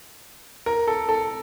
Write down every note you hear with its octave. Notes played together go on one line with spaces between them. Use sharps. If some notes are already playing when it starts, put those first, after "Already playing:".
A#4
A4
A4